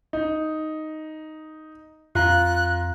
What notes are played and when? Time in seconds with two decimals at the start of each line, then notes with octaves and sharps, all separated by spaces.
0.13 D#4
2.15 F2 F4 A#5 F#6